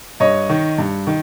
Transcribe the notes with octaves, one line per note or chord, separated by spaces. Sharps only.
G2 C#5 D#5
D#3
G2
D#3